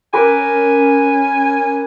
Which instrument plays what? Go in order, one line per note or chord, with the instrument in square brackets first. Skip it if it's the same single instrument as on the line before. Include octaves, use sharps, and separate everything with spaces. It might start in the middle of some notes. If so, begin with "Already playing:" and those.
[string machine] C#4 [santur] A#4 B4 D6 [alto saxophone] G#5